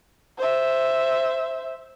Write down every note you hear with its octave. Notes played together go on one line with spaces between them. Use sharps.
C5 E5